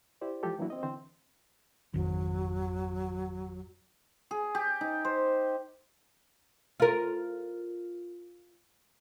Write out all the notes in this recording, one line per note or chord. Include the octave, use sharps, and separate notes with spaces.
E4 G4 C5 D5
E3 F3 G#3 F4 G4 A4
E3 F#3 A#3 D4 E4 F#4
C4 D#5
D3 E3 C4 C5
G#1 F2 D#3 F#3
G#4
G4
D#4
C5
F4 A#4